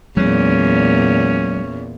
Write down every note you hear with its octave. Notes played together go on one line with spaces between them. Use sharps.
E2 A#2 F#3 G#3 C#4